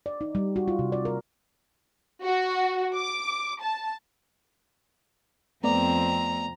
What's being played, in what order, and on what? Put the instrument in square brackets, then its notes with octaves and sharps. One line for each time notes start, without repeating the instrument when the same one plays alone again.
[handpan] D5
D#4
G3
F#4
F4
C3
D5
A#4
[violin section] F#4
D6
A5
[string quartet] F2 C4 [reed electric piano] A3 B3 D5 [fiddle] A#5